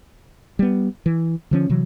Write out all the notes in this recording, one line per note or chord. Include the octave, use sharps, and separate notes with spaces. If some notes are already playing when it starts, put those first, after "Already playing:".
G3 B3
E3
D3 F3 C#4
C3 E3 F#3